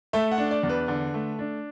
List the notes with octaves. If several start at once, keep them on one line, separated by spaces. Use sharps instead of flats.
A3 E5
F#5
D4
D5
E2
B4
D3
A3
D4